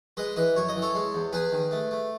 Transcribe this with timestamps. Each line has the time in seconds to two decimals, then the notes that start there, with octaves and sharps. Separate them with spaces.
0.17 G#3 B4 D#5
0.36 E3 B4 D#5
0.56 F#2 C#5
0.69 D#5
0.76 E3
0.82 A4 C#5
0.95 G#3
1.14 E2
1.33 E2 G#4 B4
1.52 D#3
1.71 A3
1.91 A3